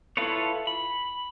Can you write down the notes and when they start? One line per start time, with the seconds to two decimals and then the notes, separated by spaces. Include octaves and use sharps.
0.17 E4 F4 A4 B4 C#5
0.67 B5